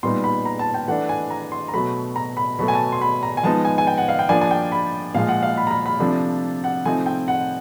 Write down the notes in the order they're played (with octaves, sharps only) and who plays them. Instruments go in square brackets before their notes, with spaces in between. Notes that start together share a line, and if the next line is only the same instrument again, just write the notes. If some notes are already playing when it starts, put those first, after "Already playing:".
[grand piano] A#2 G3 B3 D#4 C6
B5
A#5
A5
G5
E3 A3 D4 F#5
G#5
A#5
C6
A#5
B2 F#3 A3 B5
A#5
B5
B2 F#3 A3 B5
G#5
A5
C6
B5
A#5
G#5
F3 G#3 B3 D#4 A5
G#5
G#5
G5
F#5
F5
G5
F3 A#3 D4 G#5
G#5
G5
B5
A#2 F3 G#3 F5
F#5
F5
B5
A#5
B5
B5
C3 F3 A3 D4
F#5
C3 F3 A3 C4 D#4 G#5
G5
F#5